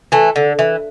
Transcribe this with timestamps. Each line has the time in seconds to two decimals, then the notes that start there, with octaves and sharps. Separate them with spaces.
0.12 E3 A3
0.36 D3
0.59 E3